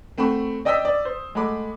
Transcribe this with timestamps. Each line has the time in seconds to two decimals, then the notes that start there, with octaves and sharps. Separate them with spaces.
0.18 A3 C4 F#5 B5 C#6
0.65 D5 D#5 G5 D#6 E6 B6
0.85 D5
1.05 C5
1.35 G#3 A3 F#5 B5 D6